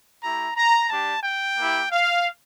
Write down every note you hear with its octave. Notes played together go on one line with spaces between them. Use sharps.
A3 E4 G4 A#5
A#5
G3 D4 G4 A5
G5
A#3 E4 G4
F5